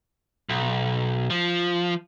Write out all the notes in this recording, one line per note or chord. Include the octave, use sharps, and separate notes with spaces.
B1
F3